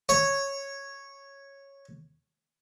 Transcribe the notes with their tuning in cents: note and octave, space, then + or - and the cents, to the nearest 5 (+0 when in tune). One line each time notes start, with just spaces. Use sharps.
C#5 -5